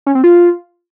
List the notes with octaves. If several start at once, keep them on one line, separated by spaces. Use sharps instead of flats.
C#4
C4
F4